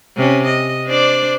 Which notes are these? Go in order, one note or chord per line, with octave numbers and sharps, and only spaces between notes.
C3 C#4
D#5
D4 C5 D5